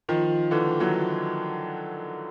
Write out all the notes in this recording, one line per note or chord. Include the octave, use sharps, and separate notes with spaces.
D#3 F3
D3 E3
E3 F#3